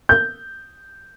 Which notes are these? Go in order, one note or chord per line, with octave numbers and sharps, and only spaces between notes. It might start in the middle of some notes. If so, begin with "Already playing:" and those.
G6